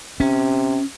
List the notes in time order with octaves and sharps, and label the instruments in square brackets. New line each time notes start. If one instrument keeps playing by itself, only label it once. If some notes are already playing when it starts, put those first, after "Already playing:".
[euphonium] C3 [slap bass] C#4